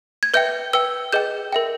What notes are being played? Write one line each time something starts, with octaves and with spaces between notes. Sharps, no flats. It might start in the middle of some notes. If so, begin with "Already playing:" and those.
G#6
B4 E5 G5 G6
B4 G5 E6
G#4 B4 D#5 G5 G6
A#4 E5 G5